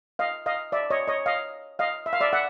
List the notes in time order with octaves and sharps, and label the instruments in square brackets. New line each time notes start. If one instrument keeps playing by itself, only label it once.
[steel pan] D#5 F5
D#5 F5
D5 E5
C#5 D#5
C#5 D#5
D#5 F5
D#5 F5
E5
F5
D5 E5
E5 F#5